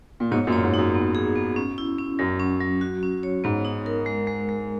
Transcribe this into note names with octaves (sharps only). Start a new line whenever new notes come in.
A#2
G#2 B2 C#5
F#2 A#2
C#5
G#2
F#2 D#4
B3
G#4
B3
C#4
E4
C#4
F#2 F#3
C#4
F#3
F#4
C#4
C#5
G#2 B3
D#4
A#4
G#3
G#3
G#3